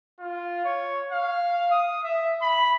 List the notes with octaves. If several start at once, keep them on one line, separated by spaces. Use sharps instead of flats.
F4
C#5
F5
D#6
E5
B5